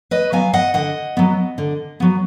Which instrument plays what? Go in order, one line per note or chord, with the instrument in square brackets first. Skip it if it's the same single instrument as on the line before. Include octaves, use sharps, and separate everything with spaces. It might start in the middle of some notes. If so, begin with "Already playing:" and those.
[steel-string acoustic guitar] B4 D#5
F#3 B3 F5 G#5
D#5 F#5
D3 D#5 F#5
F#3 B3
D3
F#3 B3